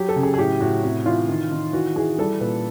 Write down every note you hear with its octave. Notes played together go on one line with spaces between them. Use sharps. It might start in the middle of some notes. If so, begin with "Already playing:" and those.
Already playing: F#3 G4
A4
C#3
G#4
G#4
A2 G4
A2 F#4
C3 F#4
E3 F4
D#3
D#3
E3 F#4
E3 G#4
G3 A4
A#2 B4